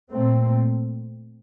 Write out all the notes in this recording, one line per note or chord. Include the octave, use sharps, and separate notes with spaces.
A#2 A3 C4